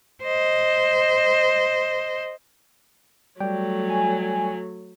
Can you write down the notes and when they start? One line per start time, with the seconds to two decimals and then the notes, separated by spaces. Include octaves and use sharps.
0.23 C5 D#5
3.41 F#3 G3 A3 D5 G5
3.89 G#5